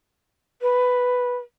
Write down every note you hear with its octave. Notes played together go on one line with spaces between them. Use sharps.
B4